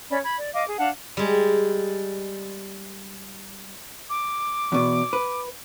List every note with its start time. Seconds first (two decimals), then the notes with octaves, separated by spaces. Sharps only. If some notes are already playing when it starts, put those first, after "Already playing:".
0.10 C#4 C#5 D5 B5
0.23 B5 G#6
0.38 D5
0.54 D#5 F5 D6
0.66 G#4
0.79 D4 F5 F#5 A5
1.17 G3 G#3
4.10 D6
4.72 E2 B2
5.13 B4